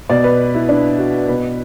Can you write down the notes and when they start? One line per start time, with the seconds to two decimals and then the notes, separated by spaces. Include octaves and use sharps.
0.09 B2 D5
0.24 B4
0.55 E4
0.69 D4
0.98 F#4
1.28 B2 B4